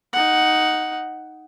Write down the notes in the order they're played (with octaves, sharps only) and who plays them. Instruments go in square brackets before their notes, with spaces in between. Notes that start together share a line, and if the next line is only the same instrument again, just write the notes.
[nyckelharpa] D#4 F#5